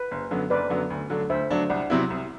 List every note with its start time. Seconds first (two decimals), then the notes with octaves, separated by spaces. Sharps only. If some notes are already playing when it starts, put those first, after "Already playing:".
Already playing: B4
0.11 F#1
0.31 F#2 D3 F#3 B3
0.50 F#1 B4 D5
0.70 F#2 D3 F#3 B3
0.90 D2
1.10 D3 F#3 A3 D4
1.30 D2 C5 E5
1.50 D3 F#3 A3 D4
1.70 C2 D5 F#5
1.90 C3 F#3 C4 E4
2.10 C2